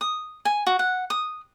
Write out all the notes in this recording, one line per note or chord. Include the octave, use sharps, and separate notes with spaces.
D#6
G#5
F#4
F#5
D#6